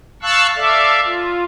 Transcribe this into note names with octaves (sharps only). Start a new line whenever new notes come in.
F5 A5 C#6 E6 F#6
A4 D5 E5 F5
F4